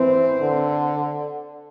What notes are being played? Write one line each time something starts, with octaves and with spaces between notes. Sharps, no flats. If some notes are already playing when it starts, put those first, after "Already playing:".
Already playing: E3 C4
D3